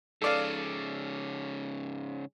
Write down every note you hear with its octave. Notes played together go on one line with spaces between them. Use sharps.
G#2 C#3 A4 D5 F5